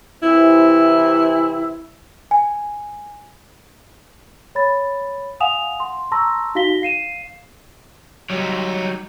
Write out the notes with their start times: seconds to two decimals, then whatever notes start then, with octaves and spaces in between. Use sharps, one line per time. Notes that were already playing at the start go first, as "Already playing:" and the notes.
0.22 C3 E3 E4
2.31 G#5
4.55 C#5 B5 A6
5.40 F5 F#5 G#5 D#6 E7 F7
5.80 C6
6.12 A5 A#5 C6 C#6 E6 A#6
6.55 D#4 F#4 F5 A#6 B6 G7
6.82 F5 C7 D#7 E7
8.30 F#3 G3 D#4 C#5